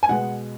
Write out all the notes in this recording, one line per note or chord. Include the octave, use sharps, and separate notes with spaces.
G#5
B2 G#3 B3 F#5